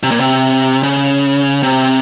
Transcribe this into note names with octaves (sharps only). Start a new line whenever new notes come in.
C3
A#2
C3
C#3
C3